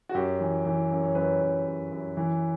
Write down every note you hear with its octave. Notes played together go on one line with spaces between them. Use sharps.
F#4
F#2 G4
E3
E3
F#2
C#5
F#2 B4
F#2
F#2
F#2
E3